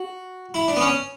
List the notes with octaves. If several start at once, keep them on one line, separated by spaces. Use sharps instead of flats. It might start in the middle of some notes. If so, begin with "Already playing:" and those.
Already playing: F#4
E4
D4
B3
C#4